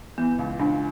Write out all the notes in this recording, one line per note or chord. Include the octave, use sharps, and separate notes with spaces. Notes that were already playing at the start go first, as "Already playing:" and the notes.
E3 B3
C#2
C#2 D4